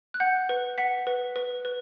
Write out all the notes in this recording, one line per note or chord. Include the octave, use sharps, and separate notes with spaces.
F#6
F#5 G6
B4
F#5 B6
B4
B4
B4